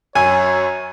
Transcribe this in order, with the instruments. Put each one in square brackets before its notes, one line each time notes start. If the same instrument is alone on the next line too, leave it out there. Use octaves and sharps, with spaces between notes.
[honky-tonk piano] F#2 [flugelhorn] C#5 [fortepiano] G#5